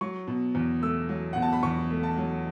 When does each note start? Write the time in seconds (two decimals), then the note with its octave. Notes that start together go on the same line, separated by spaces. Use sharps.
0.01 F#3 C#6
0.27 B2
0.55 E2
0.82 A3 E6
1.09 F#3
1.33 B2 F#5
1.42 A5
1.52 B5
1.63 E2 C#6
1.91 A3
2.03 A5
2.17 F#3